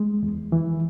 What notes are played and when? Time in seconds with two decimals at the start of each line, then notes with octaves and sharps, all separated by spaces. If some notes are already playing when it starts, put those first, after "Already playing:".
Already playing: G#3
0.23 E2
0.52 E3